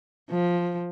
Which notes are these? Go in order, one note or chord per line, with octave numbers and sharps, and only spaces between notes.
F3